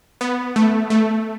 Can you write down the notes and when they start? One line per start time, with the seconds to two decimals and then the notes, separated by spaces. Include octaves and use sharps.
0.21 B3
0.56 A3
0.90 A3